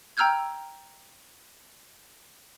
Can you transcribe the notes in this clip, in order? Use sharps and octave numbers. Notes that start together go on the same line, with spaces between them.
G5 A#5 E6 F6 G6 G#6